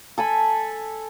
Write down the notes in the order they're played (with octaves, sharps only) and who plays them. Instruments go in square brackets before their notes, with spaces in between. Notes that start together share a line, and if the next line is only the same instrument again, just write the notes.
[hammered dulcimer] A4 G#5 B5